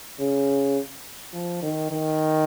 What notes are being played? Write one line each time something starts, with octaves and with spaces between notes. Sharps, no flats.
C#3
F3
D#3
D#3